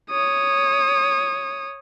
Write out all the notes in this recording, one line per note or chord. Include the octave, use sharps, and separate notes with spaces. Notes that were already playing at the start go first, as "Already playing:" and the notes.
C#5 D#6